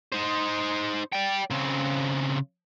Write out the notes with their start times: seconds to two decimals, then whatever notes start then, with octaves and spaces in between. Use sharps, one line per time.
0.13 D#4 C5
1.12 D5 G5
1.51 C#3 C4